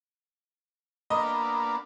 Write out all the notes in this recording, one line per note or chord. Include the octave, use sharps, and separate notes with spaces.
A#3 B3 D4 D#5